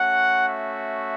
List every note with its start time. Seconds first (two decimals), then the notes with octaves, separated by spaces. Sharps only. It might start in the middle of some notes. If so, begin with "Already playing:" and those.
Already playing: A3 C#4 F#4 F#5
0.47 E5